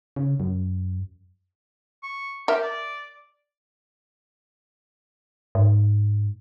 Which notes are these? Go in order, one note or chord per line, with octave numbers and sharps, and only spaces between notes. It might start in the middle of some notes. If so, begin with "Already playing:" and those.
C#3
F#2
C#6
G4 A#4 E5
D5
G#2